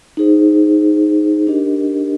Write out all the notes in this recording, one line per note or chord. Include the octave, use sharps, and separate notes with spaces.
D#4 G#4 C5
D4 G4 A#4 D#5